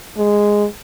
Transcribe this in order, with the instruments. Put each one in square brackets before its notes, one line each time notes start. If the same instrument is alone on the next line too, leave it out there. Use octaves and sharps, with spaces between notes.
[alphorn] G#3